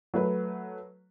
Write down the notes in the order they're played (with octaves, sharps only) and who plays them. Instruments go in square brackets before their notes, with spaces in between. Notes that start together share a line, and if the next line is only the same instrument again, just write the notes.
[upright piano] F#3 A3 B4